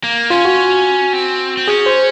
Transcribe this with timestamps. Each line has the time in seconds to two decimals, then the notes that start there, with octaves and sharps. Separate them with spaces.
0.04 A#3
0.30 C#4 F4
0.45 F#4
1.13 C4
1.57 C4
1.68 C#4 G#4
1.86 C5